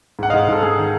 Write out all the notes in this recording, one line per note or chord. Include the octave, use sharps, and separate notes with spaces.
G#2 F#5
D#5 F5
G#2
G#2 A4
G#2 G#4
D#3